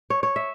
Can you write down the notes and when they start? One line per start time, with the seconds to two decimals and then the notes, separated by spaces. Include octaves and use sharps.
0.10 C#5
0.23 C#5
0.36 E5